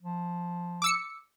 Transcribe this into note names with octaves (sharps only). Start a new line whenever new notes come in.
F3
D6 E6 C#7